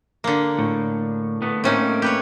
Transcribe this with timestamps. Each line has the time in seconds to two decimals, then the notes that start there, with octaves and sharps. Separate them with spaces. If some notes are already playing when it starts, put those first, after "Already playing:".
0.24 D3 A#3
0.59 A2
1.42 A3 B3
1.64 A2 A3 A#3 C4 C#4 D#4
2.02 G4 B4 C#5